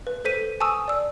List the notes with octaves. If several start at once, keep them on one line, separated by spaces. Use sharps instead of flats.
B4
A4 C5 B6 D#7
G#5 A5 C#6 D#6 E6
D5 E6